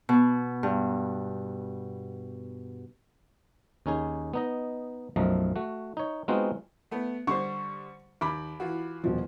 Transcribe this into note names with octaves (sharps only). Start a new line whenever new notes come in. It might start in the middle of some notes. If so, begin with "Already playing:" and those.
B2
G2
D#2 C#4 D#4 G#4
B3 D#4 D#5
B1 F#2 F3 A3 D#5 A#5
A3 F#4
D#4 C#5
G#3 B3 C4 D#4 F4 F#4
A3 B3
D3 G3 C5 C#6
D#2 B5 D6
E3 F4 F#4
D#1 B2 F3